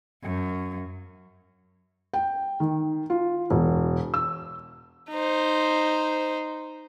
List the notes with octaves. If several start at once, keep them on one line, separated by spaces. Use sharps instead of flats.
F#2
G5
D#3
F4
E1
E6
D#4 C5